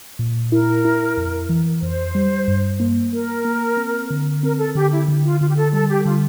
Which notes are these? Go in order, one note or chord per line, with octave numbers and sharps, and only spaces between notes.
A#2
E4 A#4
E4
F2
E3
F2 C5
G3
G2
A#3
A#3 A#4
A#3
C4
D3
C4 A#4
A4
D3 G4
E4
D3
F4
D3 F4
G4
A4
G3 A4
G4
D3 F4